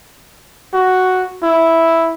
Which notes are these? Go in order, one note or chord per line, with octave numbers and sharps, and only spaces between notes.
F#4
E4